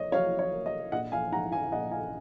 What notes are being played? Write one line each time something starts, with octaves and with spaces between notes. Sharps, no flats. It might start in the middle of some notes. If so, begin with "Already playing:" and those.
Already playing: A#3 C#5 D#5
F#3 C#5 F5
C#5
A#3
D#5
A#1 D#5 F#5
F5 G#5
G#2 F#5 A#5
F5 G#5
A#1 D#5 F#5
F5 G#5